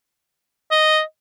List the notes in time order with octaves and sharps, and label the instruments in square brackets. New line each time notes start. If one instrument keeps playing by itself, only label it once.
[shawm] D#5